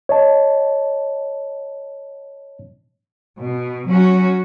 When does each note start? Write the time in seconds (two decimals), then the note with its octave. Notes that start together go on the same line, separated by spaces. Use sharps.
0.09 C#5 D#5 A5
3.40 B2
3.88 F#3 C#4 F#4